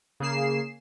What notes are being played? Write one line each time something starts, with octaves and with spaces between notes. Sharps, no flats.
C#3 A#3 G#4 C7 E7